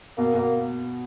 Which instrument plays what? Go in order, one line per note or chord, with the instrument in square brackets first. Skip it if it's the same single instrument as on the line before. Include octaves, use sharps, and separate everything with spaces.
[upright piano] B2 [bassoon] A#3
[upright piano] B2 [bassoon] A#3